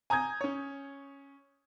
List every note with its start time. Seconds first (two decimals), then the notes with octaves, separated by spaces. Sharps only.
0.10 G#5 A#5 D#6 G6 G#6
0.41 C#4 C#5